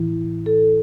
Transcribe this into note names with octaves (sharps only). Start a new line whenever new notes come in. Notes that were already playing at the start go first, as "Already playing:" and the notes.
Already playing: A2 E3 E4
A4